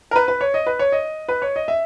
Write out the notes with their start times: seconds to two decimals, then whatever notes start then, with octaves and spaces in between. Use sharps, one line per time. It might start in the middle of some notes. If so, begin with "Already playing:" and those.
0.11 A#4
0.16 B4
0.28 B4
0.41 C#5
0.54 D#5
0.67 B4
0.79 C#5
0.92 D#5
1.28 B4
1.42 C#5
1.56 D#5
1.68 E5